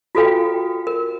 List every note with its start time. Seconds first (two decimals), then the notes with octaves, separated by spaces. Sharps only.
0.15 F4 F#4 A4 B4 F5 G5
0.87 A#4